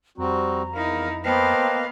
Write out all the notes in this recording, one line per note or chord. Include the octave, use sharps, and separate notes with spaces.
F2 G3 C4 F#4 A#5
E2 D#4 E4 A#4 F5
A#3 B3 B4 C5 D#5 F5 G5 A5